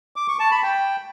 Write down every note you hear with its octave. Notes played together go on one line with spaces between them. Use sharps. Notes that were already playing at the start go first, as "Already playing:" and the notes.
D6
C#6
A5
B5
G5